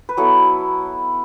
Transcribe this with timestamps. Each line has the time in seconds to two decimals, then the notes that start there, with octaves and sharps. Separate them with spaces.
0.09 B4
0.17 F#3 B3 E4 A4